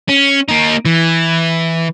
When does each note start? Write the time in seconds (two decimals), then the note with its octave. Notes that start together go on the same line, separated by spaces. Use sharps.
0.09 C#4
0.49 A#3 D#4
0.85 E3